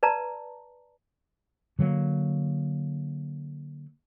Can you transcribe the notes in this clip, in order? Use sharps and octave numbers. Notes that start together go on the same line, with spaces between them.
B4 D5 A5 A#5
D3 F#3 G3 A#3